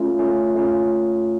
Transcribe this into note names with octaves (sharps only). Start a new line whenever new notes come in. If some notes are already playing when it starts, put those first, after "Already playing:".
Already playing: A3 C#4 F4
A3 C#4 F4
A3 C#4 F4